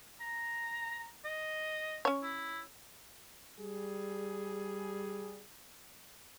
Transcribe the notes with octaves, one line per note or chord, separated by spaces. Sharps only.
A#5
D#5
C#4 C#5
E4
G3 G#4